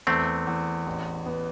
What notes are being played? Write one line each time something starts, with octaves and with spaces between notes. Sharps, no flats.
E2 A3 C4
E2
A1
B3